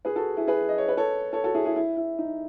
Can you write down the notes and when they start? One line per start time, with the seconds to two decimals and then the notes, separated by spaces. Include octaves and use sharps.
0.05 G#4 B4
0.16 F#4 A4
0.37 E4 G#4
0.47 G#4 B4
0.69 D#5
0.78 C#5
0.89 B4
0.97 A4 C#5
1.33 A4 C#5
1.44 F#4 A4
1.54 E4 G#4
1.65 E4 G#4
1.76 E4
1.97 E4
2.19 D#4